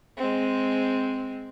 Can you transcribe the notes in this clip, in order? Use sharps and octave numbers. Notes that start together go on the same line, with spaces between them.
G#3 C4